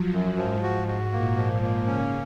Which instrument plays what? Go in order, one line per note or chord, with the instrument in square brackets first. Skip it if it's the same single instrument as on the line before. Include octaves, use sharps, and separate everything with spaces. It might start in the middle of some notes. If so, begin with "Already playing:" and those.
Already playing: [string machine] F3 F#3
[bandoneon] F#2
[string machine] G#2 [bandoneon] F3
[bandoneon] F#4
F#4
[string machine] A#2 [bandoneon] A#3
[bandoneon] F3
[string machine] A#2
[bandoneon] A#3
[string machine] C#3 [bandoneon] C#4